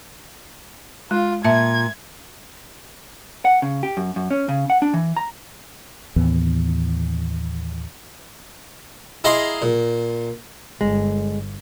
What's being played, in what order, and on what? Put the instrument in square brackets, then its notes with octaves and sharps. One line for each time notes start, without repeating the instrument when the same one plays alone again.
[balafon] G#3 [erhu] F4
[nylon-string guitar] A#2 [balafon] E5 A5 [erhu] G#6
[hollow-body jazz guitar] F#5
C#3
G4
F#2
F#2
C#4
C#3
F#5
D4
E3
A#5
[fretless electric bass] D#2 A2 E3 B3
[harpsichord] E4 G#4 D#5 F5 A#5 C6
A#2
[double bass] G1 [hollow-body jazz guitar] G#3